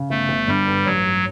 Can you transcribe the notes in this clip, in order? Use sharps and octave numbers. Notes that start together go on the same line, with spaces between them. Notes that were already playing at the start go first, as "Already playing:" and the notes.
Already playing: C#3
G1 A3
G1
D3 G3
G2
A1 F#3
G2